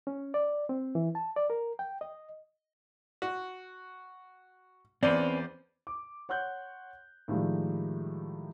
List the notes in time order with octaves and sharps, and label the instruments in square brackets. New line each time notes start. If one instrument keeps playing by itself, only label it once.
[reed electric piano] C#4
D5
C4
E3
A5
D5
A#4
G5
D#5
[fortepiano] F#4
[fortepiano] E2 C5 D5 [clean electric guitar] C4 C#4 B4
[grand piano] D6
C#5 F#5 C6 F#6 G6
A2 D#3 F3 G3 G#3